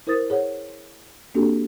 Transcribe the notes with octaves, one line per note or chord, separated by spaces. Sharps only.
E4 A#4 C5 D#6 A6
G#4 C#5 F#5
A#3 C4 D4 F#4 G4 A4